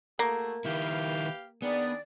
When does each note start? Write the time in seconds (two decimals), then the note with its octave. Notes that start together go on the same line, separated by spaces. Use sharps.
0.19 A3 A#3 F#4 G#4
0.65 D#3 E4 G4 B4 F5
1.62 D#3 B3 D4 G#4 D5